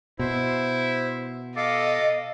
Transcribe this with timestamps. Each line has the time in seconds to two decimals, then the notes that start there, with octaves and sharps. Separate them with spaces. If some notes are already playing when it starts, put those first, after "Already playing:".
0.19 B2 E4 C5
1.56 A4 D#5 F5 D6